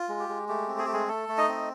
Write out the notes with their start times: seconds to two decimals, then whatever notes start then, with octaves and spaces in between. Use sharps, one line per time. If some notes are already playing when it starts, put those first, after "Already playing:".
Already playing: F4
0.09 G#3
0.19 G4
0.29 G#3
0.49 A3 G4
0.68 C4
0.79 G#4
0.85 A3 G4
0.93 G#3 G#4
1.08 A3 A4
1.29 A3
1.38 D#4 D#5
1.48 C4